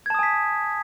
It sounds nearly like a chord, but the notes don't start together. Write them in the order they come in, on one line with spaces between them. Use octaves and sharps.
G#6 A5 D#6 G#5 B6